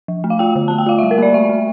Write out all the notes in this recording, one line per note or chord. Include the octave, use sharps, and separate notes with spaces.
F3
A3
F5
F4 G5
D3
A3 A5
G5
F4 F5
E5
G3
A#4
A#3 D5
A3 E5
A3